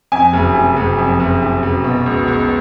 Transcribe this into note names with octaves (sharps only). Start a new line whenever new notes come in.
F2 G#5
F#1
C3
F#1
F2
F#1
C3
F#1
B2
C#2
C#2